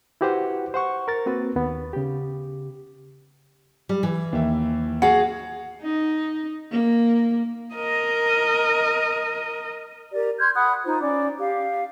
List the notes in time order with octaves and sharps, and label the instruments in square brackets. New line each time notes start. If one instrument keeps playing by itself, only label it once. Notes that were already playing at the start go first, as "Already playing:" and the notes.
[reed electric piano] E4 F#4 G4 B4 C5 F#5
C5 F#5 C#6
A#4 A6
A#3 C4 F#4 B4
D#2 B3
C#3 G4
[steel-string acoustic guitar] G3
E3
[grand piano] D#2 E5
[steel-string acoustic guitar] F#4 G#4 F5 [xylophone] F#5
[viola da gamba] D#4
A#3
[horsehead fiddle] A#4 D#5
[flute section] G4 A#4 D5
C6 F6 G6 G#6
F#5 B5 D#6 F#6
D#4 F4 C5
C#4 D5 D6
G4 F5